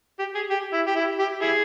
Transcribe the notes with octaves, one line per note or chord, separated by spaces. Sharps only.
G4
G#4
G4
E4
G4
E4
G4
E4 G#4